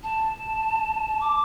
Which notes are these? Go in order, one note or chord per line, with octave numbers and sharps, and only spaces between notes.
A5
D6